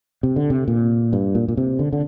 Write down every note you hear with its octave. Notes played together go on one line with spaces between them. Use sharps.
C3
D3
C3
A#2
G2
A#2
A#2
C3
D3
D3